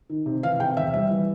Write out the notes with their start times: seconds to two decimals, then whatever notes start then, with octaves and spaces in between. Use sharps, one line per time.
0.09 D#3
0.26 C3
0.43 E3 F5
0.59 C3 G5
0.77 E2 E5
0.94 G3 E5
1.10 E3